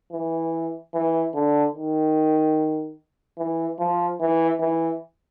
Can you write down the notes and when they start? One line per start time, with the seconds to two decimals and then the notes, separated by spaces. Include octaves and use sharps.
0.12 E3
0.94 E3
1.35 D3
1.75 D#3
3.38 E3
3.79 F3
4.20 E3
4.60 E3